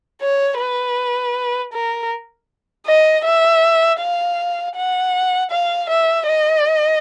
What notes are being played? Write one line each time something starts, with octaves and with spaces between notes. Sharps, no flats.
C#5
B4
A#4
D#5
E5
F5
F#5
F5
E5
D#5